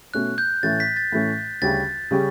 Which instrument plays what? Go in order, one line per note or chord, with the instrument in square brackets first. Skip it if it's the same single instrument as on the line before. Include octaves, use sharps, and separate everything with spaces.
[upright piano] B2 A3 C#4 [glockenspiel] F#6
[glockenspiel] G6
[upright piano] A2 E3 A3 C#4 [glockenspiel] A6
[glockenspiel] B6
A6
[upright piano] A2 E3 A3 C#4
[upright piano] D2 C#3 G3 C#4 G4 [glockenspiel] A6
[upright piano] C#3 G3 C#4 G4